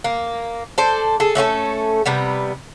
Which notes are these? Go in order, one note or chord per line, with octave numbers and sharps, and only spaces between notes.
A#3
A4 C5 D5
G#4 A4
A3 C#4 F4 A4
C3 G3 B3